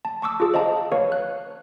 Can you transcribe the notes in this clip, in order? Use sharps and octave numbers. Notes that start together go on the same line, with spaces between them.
A5
A5 C#6 D6 E6
F4 G#4
C5 D#5 F5 A5 A#5
B4 C#5 F5 C#6
F#6